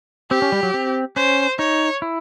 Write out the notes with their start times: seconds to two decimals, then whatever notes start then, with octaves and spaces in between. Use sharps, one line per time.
0.31 C4 G4
0.42 C#4
0.52 G3
0.63 F#3
0.74 C4
1.16 C#4 C5
1.59 D#4 C#5
2.02 E4